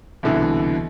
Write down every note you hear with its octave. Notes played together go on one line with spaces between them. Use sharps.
C2 B2 D3 E3